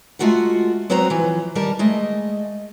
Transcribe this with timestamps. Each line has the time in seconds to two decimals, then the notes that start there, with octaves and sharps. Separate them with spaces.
0.19 G#3 A3 F4 F#4 A#4 F#5
0.90 F#3 B3 C4 F#4 C5 A#5
1.10 E3 F3
1.55 D#3 G3 A#4 A5
1.79 G#3 A3 D#5